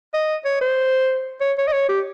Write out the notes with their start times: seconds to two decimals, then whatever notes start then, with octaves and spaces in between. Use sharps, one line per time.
0.14 D#5
0.45 C#5
0.61 C5
1.41 C#5
1.58 C#5
1.68 D#5
1.73 C#5
1.89 G4